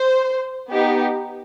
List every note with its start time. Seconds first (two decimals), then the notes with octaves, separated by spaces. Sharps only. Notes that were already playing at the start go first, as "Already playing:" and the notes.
Already playing: C5
0.69 B3 D#4 G4